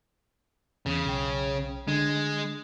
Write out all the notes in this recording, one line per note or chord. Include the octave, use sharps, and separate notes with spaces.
E2 C#3
B1 G5
D3 G#3